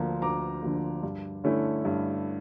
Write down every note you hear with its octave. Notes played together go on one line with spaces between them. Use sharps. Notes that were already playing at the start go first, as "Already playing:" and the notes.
Already playing: D2 D3 F3 A#3
D2 A#5 D6
D3 F3 A#3
G2
D3 A3 C#4 E4
G2